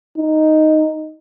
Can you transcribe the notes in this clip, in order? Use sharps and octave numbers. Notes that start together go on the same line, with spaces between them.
D#4